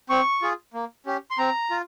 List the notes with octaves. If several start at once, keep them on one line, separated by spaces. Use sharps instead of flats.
C4 C#6
F4 G#4
A#3
C#4 G4
C6
C4 A#5
F4